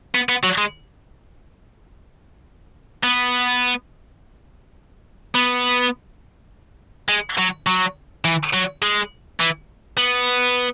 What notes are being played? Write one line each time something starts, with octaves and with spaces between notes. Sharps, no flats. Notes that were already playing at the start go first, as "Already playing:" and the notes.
B3
B3
F#3
G#3
B3
B3
G#3
F#3
F#3
E3
F#3
G#3
E3
B3